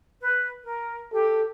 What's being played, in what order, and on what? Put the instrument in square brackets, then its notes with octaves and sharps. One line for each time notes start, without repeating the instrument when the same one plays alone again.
[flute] B4
A#4
[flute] G4 [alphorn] A4